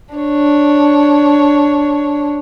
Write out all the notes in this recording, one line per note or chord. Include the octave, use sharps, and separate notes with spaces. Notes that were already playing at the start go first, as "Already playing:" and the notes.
D4 C#5